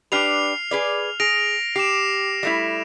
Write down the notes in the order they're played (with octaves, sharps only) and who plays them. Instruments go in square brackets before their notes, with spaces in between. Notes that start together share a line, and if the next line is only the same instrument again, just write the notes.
[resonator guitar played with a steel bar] D4 G4 B4 [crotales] F6 C7 F7
[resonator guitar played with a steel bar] G#4 B4 D5
[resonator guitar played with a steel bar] G#4 [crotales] A#6 D7 F7
[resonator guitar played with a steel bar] G4 [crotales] C7 E7
[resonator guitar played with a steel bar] G3 A3 E4